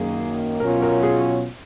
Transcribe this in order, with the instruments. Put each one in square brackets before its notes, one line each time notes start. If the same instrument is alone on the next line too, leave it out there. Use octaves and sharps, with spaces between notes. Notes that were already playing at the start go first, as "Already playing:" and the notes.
Already playing: [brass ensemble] F#2 D#3 A#3 [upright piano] G#4
[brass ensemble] B2 F#3 C#4 F4 [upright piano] A#4
[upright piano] A#4
G#4